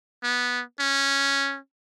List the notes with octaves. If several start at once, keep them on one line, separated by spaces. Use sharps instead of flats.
B3
C#4